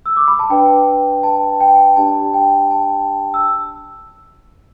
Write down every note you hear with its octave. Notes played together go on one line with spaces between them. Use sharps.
E6
D6
B5
A5
D4 B4 D5 G5
A5
G5
D4 G4 D5 A5
G5
A5
E6